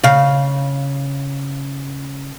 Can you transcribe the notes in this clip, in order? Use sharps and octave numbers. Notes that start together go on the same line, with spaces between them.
C#3 F5